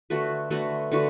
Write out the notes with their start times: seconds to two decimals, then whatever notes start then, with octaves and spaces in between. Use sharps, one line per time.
0.10 D3 A3 F#4 B4
0.51 D3 A3 F#4 B4
0.92 D3 A3 F#4 B4